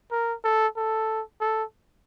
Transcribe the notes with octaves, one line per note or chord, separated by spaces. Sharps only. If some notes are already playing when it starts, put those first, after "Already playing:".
A#4
A4
A4
A4